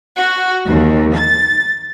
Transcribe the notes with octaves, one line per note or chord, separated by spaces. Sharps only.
F#4
D#2
A6